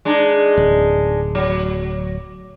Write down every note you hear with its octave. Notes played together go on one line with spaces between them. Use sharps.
G#3 D4 D#4
D1
F#3